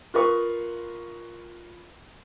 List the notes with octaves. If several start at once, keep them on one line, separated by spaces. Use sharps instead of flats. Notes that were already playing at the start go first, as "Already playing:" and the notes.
F4 A#4 B4 C#6 D#6